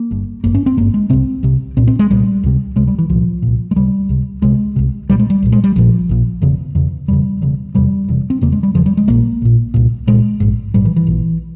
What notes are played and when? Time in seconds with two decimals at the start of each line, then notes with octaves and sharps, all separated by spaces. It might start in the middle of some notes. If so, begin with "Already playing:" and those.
Already playing: A#3
0.11 G1 G2
0.44 G#1 G2 A#3
0.55 C#4
0.66 C4
0.77 G#1 G2 A#3
0.94 G#3
1.10 C2 C3 C4
1.43 C2 C3
1.77 C2 A#2 C4
1.88 C4
1.99 G#3
2.10 C2 A#2 G3
2.43 C#2 C3
2.76 C#2 C3 G#3
2.87 G3
2.99 E3
3.09 C2 A#2 F3
3.42 C2 A#2
3.71 G#3
3.76 C#2 C3 G3
4.09 C#2 C3
4.42 C2 C3 G#3
4.76 C2 C3
5.09 C2 A#2 G3
5.20 G#3
5.30 G3
5.43 C2 A#2
5.52 G#3
5.64 G3
5.76 A#1 A#2 F3
6.09 A#1 A#2
6.42 E1 E2 C#3
6.75 E1 E2 C#3
7.08 E1 E2 C#3 G3
7.42 E1 E2 C#3
7.75 E1 E2 C3 G3
8.08 E1 E2 C3
8.30 C4
8.41 E1 E2 C#3 A#3
8.52 G#3
8.63 G3
8.75 E1 E2 C#3 F3
8.86 G3
8.97 G#3
9.08 A#1 A#2 A#3
9.42 A#1 A#2
9.74 C2 A#2
10.07 C2 A#2 G#3
10.40 A#1 G#2
10.74 A#1 G#2 G3
10.85 E3
10.96 E3
11.07 A#1 A#2